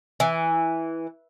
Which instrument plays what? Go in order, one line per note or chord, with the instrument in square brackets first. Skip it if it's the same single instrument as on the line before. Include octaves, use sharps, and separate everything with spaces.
[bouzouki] E3